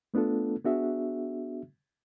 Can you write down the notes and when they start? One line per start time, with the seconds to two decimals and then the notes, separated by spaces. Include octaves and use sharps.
0.14 A3 B3 D4 F4 A4
0.65 B3 D4 F#4 G#4 E5